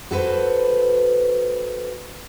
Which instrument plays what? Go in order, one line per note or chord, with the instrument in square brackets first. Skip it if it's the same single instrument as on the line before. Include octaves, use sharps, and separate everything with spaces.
[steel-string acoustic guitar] F#4 A4 B4 C5